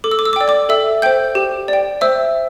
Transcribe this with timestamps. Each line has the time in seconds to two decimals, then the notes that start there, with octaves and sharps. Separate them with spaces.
0.04 A4 D6
0.11 E6
0.19 D6
0.25 E6
0.33 D6
0.36 D5 G5 E6
0.48 D5 D6
0.69 A4 E5 E6
1.02 C5 G5 G6
1.35 G4
1.68 D5 G5
2.01 C5 E5 E6